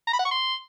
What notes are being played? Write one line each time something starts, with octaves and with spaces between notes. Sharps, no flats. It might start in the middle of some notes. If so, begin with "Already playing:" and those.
A#5
B5
F#5
C#6
C6